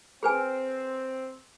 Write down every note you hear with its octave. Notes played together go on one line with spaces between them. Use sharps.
C4 G#4 B4 G#5